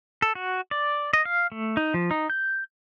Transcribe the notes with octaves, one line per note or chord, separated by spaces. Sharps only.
A4
F#4
D5
D#5
F5
A3
D#4
F3
D#4
G6